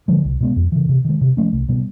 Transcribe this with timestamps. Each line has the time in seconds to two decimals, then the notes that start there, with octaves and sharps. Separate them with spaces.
0.08 D3 F3 G#3
0.25 C2
0.40 B2 G#3 B3
0.56 F2
0.72 C#3 E3
0.89 C3
1.05 D#3 G#3
1.21 C3
1.37 F3 A3 C#4
1.53 C2
1.69 B2 G3 B3